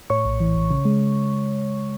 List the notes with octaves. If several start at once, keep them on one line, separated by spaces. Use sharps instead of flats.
A2 C#5 C#6
A#1
E3
A#1
C#3
G#3